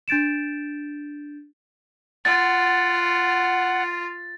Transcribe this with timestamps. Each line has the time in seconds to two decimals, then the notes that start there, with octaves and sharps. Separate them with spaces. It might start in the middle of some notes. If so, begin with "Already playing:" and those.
0.08 D4 G6 A6 D7 E7
2.25 F4 F#5 A6